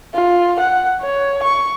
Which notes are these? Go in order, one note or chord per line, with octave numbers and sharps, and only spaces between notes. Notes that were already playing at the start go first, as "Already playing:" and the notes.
F4
F#5
C#5
C#6